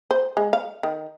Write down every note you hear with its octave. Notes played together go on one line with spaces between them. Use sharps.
C5
G#3
F5
D#3